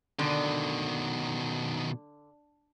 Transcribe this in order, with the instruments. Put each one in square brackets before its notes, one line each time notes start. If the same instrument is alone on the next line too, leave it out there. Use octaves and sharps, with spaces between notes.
[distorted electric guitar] B2 D#3 [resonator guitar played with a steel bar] D3